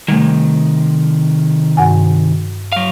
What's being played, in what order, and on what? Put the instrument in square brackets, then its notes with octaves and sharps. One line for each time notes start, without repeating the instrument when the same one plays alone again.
[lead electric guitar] C3 D#3 [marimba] G3 A3
[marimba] G2 F#5 G#5
[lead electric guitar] F#3 F5